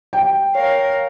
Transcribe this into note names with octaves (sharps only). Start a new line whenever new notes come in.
G5
A#4 C#5 F5